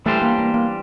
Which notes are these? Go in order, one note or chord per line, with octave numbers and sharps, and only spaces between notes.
E3 G3 A3 D4 G4 C5
A#3
A#3
A#3